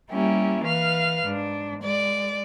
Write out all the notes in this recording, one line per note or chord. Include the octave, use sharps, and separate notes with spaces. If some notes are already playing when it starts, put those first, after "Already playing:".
G3 A#3 C#4 E4 G4
E3 B4 F5 F6
G#2 D4
G#3 D5